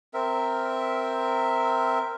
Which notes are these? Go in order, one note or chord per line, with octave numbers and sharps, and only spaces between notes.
C4 A#4 E5